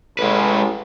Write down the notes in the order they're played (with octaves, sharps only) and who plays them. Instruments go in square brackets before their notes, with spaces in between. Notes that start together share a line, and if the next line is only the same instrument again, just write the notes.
[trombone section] A1 [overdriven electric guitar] G#3 B4